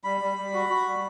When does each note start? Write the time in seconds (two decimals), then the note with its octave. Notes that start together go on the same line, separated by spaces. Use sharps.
0.04 G3 B5
0.21 G3
0.37 G3
0.54 F#4
0.70 F#4
0.86 G3